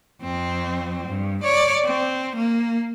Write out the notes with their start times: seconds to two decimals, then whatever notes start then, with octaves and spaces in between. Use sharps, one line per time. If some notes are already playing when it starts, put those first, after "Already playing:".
0.22 F2 C4
1.08 G2
1.43 C#5 D5
1.85 C4
2.36 A#3